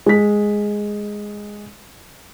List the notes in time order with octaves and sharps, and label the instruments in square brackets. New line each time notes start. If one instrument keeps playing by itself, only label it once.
[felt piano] G#3 B6